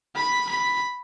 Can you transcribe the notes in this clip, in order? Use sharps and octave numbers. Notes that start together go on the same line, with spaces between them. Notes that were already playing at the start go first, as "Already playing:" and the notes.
B5
B5